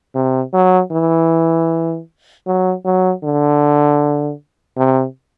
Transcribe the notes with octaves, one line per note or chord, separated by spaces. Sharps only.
C3
F#3
E3
F#3
F#3
D3
C3